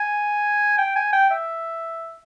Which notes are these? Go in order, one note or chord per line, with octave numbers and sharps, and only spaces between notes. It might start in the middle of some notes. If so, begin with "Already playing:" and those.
Already playing: G#5
G5
G#5
G5
E5